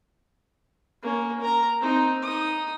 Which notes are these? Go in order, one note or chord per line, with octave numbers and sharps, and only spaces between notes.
A#3 C#4
A#4 A#5
C4 D#4
D#4 D#6